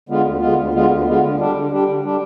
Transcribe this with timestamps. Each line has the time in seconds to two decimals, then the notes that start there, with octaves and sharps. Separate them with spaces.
0.09 D3 G#3 B3 F4
0.24 D2
0.41 D3 G#3 B3 F4
0.58 D2
0.73 D3 G#3 B3 F4
0.90 D2
1.06 D3 G#3 B3 F4
1.23 D3
1.38 G3 D4 G4
1.55 D3
1.71 G3 D4 G4
1.87 D3
2.04 G3 D4 G4